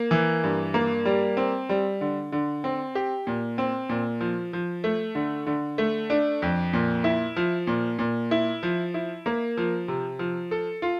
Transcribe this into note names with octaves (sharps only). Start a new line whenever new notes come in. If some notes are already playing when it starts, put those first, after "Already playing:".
Already playing: A#3
E3
G2
A#3
G3
C4
G3
D3
D3
C4
G4
A#2
C4
A#2
F3
F3
A3
D3
D3
A3
D4
F2
A#2
E4
F3
A#2
A#2
E4
F3
E4
A#3
F3
C3
F3
A4
F4